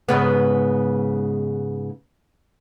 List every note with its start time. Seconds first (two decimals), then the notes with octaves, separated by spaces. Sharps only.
0.09 G#2 C#3 B3